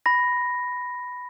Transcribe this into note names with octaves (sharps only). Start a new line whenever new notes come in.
B5 A#6